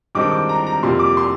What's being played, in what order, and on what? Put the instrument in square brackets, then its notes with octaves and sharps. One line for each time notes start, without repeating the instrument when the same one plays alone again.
[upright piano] G2 D#3 G#3 C4 D#4 D6
D6
A#5
A#5
F2 C3 G3 A#3 C6
D6
C6